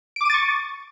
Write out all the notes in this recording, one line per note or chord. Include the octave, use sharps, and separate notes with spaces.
C#6 D6 A6 D7 D#7